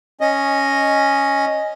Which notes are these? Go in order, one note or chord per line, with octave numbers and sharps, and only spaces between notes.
C#4 D#5